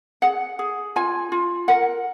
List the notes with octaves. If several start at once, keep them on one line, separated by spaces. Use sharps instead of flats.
G#4 F#5
G#4
F4 G#5
F4
A#4 F#5